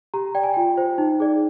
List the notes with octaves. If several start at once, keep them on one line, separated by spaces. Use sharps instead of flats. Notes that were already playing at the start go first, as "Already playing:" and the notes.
G4 A#5
D5 G5
G#5
F4 G5
C5
D#4
G#4 D5